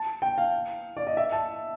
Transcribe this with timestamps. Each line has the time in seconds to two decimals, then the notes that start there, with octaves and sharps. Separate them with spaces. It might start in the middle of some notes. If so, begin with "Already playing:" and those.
Already playing: A5
0.22 G5
0.38 F5
0.97 D5
1.07 D#5
1.17 E5
1.32 A5